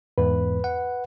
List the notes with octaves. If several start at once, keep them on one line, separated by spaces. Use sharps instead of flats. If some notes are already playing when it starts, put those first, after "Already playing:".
E2 G#2 B4
F#5